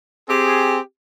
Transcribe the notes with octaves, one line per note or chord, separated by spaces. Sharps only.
C4 G4 G#4